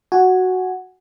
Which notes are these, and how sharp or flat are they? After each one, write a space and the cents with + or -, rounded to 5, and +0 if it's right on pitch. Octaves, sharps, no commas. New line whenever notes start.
F#4 +0 G#5 +0